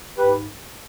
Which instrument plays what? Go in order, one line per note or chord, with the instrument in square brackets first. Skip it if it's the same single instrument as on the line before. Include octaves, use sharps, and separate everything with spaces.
[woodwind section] G#2 G4 B4